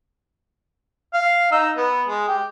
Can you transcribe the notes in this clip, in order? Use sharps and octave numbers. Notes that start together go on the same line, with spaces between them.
F5
D#4 E6
B3
G#3
G4